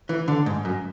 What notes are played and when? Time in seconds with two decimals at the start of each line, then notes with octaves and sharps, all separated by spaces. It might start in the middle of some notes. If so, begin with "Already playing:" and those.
0.09 E3
0.28 D3
0.46 G#2
0.65 F#2